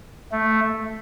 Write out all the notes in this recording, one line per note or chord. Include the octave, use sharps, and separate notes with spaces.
A3